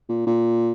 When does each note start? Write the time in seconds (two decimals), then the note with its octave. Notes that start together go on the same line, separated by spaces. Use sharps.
0.09 A#2
0.26 A#2